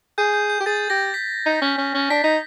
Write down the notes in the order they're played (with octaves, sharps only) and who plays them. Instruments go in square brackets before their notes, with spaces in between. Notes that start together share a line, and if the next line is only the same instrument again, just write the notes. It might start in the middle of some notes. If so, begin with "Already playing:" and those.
[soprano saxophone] G#4 [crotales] G6
[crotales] G6
G6
[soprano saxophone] G4
[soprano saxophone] G#4 [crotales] A6
[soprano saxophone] G4 [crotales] A#6
[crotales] B6
[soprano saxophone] D#4
C#4
C#4
C#4
[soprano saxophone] D4 [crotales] B6
[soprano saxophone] D#4